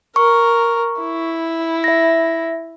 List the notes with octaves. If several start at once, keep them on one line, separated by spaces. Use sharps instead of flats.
A#4 C#6
E4
E5 A#6